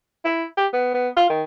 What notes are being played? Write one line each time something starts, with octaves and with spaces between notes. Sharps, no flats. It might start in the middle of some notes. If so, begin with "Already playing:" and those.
E4
G4
B3
B3
F4
D#3